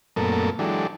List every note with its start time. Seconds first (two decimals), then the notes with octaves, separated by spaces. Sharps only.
0.16 F#2 A#2 A3 B3 A4 A#4
0.59 E3 F#3 G#3 D4 G4 A4